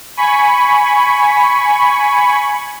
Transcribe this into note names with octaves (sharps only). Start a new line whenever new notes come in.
G#5 B5 C#6